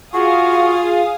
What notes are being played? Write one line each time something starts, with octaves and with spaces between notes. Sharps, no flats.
F4 F#4 G#4 F5 G#5 D#6